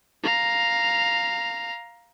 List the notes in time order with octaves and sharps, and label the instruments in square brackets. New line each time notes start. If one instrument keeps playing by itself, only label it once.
[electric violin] F5 A#5